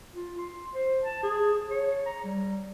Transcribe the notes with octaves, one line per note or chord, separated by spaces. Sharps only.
F4
C6
C5
A5
G#4
C#5
A#5
G3